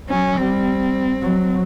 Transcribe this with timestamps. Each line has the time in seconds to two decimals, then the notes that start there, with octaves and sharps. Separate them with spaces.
0.08 F#3 C#4
0.37 G3 C4
1.21 F#3